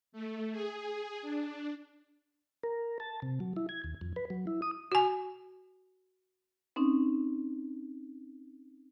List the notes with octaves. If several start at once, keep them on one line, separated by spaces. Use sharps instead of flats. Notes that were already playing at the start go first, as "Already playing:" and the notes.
A3
G#4
D4
A#4
A5
C3
F#3
E4
G#6
D#2
F2
B4
F#3
E4
D#6
F#4 G#5
C4 C#4 D#4